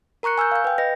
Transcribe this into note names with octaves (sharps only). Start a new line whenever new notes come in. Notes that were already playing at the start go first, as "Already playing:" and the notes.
A#4 A#5 C#6 F#6 C#7
G#5 E6 F6 G6
F5 G6
B4 G5
B4 D#5 A#6